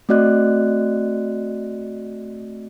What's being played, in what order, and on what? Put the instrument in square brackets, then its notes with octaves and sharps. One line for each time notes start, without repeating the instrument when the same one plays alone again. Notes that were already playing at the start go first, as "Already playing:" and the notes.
[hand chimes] A3 C4 F#4 D5 D#5 F#6